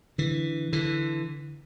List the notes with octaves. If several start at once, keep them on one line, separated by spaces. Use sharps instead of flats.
D3 E3
D3 E3